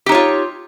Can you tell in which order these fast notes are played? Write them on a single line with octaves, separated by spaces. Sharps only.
G4 D#4 C#5 F4